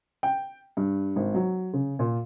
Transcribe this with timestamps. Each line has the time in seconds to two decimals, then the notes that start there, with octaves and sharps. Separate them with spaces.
0.23 G5
0.77 G2
1.16 G#1
1.34 F#3
1.73 C#3
1.99 A#2